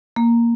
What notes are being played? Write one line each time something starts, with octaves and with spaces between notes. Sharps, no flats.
A#3